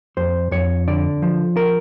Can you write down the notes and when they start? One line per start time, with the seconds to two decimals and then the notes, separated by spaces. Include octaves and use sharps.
0.17 F2 C5
0.51 F2 C#5
0.88 D3 D5
1.22 F3
1.57 A#4